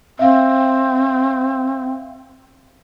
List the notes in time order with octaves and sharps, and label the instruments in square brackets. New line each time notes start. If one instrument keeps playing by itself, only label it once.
[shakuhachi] C4 [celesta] E5 F5